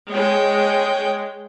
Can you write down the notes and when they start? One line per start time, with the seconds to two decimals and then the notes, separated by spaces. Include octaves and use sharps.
0.11 G#3 C#5 G5